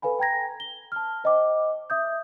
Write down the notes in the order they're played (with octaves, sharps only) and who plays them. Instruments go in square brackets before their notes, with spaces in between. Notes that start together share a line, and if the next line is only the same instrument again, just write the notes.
[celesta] A4 B4 F5 G#5 B5
G5 A#5 G#6 A#6
G7
A5 F6
C5 D#5 G5 D6
E5 D#6 G6